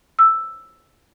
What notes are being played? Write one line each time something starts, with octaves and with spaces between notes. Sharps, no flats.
E6